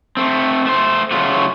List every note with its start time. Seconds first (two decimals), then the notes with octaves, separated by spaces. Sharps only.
0.17 A3 C4
0.65 A3 C5
1.11 C#3 F#3 A3 F4 F#4